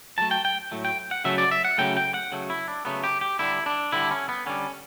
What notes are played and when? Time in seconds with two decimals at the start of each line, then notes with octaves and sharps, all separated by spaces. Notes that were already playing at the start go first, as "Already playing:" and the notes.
0.18 A2 F#3 A3 A5
0.31 G5
0.45 G5
0.71 A2 F#3 A3
0.85 G5
1.11 F#5
1.24 C#3 F#3 A3 E5
1.38 D5
1.51 E5
1.65 F#5
1.78 C#3 F#3 A3 G5
1.97 G5
2.14 F#5
2.32 C#3 F#3 A3
2.50 E4
2.68 D4
2.85 C#3 F#3 A3 B3
3.04 G4
3.21 G4
3.39 D3 G3 E4
3.66 D4
3.92 D3 G3 E4
4.11 C#4
4.29 B3
4.46 D3 G3 C#4